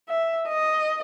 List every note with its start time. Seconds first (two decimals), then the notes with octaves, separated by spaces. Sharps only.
0.09 E5
0.48 D#5